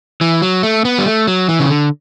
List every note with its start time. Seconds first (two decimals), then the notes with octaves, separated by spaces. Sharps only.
0.21 E3
0.42 F#3
0.63 A3
0.85 B3
0.98 G3
1.06 A3
1.27 F#3
1.49 E3
1.60 C#3
1.69 D3